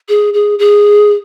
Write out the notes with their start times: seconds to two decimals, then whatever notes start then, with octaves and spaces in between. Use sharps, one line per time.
0.09 G#4
0.34 G#4
0.59 G#4